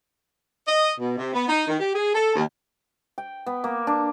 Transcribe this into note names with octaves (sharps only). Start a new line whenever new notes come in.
D#5
B2
C3
B3
D#4
D#3
G4
G#4
A4
D#2
G5
B3
A#3
D4